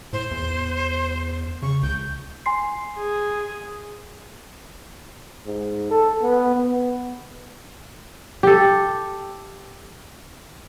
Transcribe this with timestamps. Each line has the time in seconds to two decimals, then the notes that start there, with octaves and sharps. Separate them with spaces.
0.13 A2 C5
0.31 E2
1.62 C#3 C#6
1.83 C#2 G6
2.46 G#5 C6 C7
2.97 G#4
5.46 G#2
5.91 A4
6.22 B3
6.56 B3
8.43 G4 A4